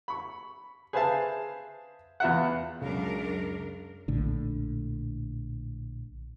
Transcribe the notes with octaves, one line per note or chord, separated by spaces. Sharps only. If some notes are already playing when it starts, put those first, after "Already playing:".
B5 C#6
G#4 B4 C5 E5 F5 A5
E2 F4 E5 F#5
C#2 F#2 D4 A#4
A#1 A2 D3